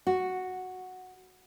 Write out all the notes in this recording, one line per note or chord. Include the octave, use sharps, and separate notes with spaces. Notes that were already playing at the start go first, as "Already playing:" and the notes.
F#4